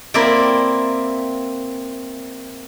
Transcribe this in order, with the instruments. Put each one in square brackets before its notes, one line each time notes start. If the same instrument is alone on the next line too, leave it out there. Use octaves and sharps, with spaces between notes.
[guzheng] A#3 C4 E4 D5 E5 G5